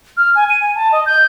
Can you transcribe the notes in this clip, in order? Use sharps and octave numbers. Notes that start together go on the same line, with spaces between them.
F6
G#5
D#7
G#5
A5
D#5
G6